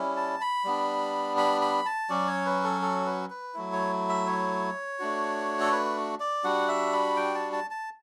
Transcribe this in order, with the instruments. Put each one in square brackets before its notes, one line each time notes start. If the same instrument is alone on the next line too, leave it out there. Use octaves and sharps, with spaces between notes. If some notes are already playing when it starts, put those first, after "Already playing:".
Already playing: [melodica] G3 C#4 E4
A5
B5
G3 B3 D4
B5
B5
A5
F#3 C#4 F#4 D5
C#5
B4
A4
A4
B4
B4
F#3 A3 E4
C#5
E5
C#5
A3 D4 F#4
A4
B4
D5
G3 D4 F#4 F#5
E5
B5
G5
A5
A5
A5